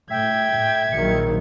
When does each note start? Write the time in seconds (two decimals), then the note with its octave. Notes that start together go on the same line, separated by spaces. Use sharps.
0.11 A2 E5 G5 G#6
0.52 A2
0.92 A#1 D#3 F#3 C#7